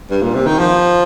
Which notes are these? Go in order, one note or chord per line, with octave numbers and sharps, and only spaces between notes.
G2
A#2
C3
D#3
F3